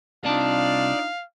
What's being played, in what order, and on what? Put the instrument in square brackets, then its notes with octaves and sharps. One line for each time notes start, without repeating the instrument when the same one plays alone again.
[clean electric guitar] C2 C4 A5 [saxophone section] D4 D#4 F4 [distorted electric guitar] D5 [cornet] F5